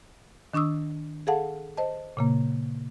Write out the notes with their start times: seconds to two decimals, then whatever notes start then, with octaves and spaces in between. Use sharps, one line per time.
0.54 D#3 D4 C#6 D#6 E6
1.27 G#4 A4 F5 F#5 A5
1.77 C5 D#5 A5
2.17 A#2 C#3 A#3